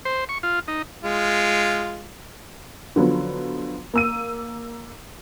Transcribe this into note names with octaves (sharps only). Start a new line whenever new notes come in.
C5
C#6
F4
D#4
G#3 F4
D3 F3 F#3 B3
A#3 E6 D#7